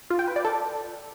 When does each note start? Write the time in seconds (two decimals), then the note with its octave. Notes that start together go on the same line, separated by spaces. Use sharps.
0.10 F4
0.19 G5
0.28 B4
0.36 D5
0.45 A4